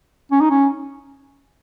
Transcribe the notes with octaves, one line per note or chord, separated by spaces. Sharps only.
C#4
D#4
C#4